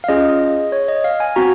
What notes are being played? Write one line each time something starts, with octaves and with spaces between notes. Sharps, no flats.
F5
C#4 F4 G#4 D#5
C#5
D#5
F5
G#5
C4 F#4 A#5